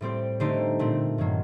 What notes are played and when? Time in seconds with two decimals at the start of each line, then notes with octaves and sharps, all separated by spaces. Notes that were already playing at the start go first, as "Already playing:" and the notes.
0.01 A2 G3 C4 G4 C5
0.40 D3 A3 D#4 G4 C5
0.79 A#2 A3 C4
1.18 G2 D#3 F#3 A#3